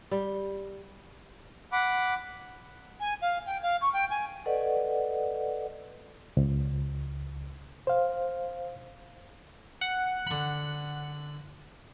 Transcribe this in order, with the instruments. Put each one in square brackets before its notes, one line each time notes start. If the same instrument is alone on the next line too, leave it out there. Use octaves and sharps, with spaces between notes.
[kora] G3
[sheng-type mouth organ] F#5 B5 D6
[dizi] G#5
F5
G5
F5
C#6
G5
G#5
[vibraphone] A4 B4 D5 D#5 F#5
[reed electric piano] C#2
C5 F5
[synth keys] F#5
[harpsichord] D3 B5